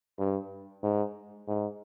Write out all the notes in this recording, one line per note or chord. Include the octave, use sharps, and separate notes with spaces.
G2
G#2
G#2